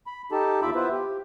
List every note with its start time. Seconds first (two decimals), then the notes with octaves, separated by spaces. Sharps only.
0.07 B5
0.32 D#4 G4 A4 A5
0.62 E2 F4 E5 B5 D6 E6
0.75 B3 E4 F4 B4 C5 E5
0.91 G4